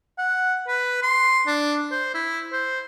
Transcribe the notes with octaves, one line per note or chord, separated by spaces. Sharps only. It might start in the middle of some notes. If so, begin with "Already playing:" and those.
F#5
B4
C6
D4
C5
E4
C5